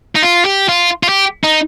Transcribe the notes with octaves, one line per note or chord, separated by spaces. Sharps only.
D#4
F4
G4
F4
F4
G4
D#4